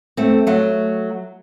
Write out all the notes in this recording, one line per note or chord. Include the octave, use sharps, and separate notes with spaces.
A3 C4
F#3 A3